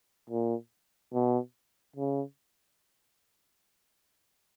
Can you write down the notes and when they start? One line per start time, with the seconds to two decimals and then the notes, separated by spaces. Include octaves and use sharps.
0.29 A#2
1.13 B2
1.96 C#3